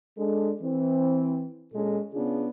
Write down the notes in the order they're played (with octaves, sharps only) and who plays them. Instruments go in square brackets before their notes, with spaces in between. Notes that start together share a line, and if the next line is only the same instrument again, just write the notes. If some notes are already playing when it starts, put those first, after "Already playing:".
[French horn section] G#3 D4 A4
E3 C4
A#2 G#3 C#4 A4
C#3 B3 C#4 D4 F4 G#4